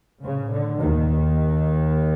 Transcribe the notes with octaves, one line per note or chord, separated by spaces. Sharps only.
A2 C#3
D3
D#2 D#3